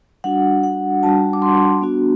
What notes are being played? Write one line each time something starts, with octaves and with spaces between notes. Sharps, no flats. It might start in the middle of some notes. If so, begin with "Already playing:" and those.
G3 D4 F#4 F#5
F#5
G3 D4 F#4 A5
D6
C6
B3 D4 F#4